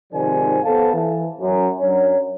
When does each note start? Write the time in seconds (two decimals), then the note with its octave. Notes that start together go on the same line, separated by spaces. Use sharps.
0.13 G#2 C3 D#3 F3 D5 G#5
0.64 B3 A4 C5 F5 A5
0.94 E3
1.40 F#2
1.80 F#2 F#3 D4 C#5